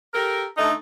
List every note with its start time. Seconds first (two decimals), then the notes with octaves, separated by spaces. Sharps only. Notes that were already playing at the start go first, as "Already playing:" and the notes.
0.14 G4 A4 A#4
0.57 D3 A3 D#4